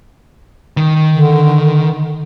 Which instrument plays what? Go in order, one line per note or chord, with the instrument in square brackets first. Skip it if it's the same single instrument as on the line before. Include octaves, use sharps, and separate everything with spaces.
[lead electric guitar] D#3
[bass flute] D3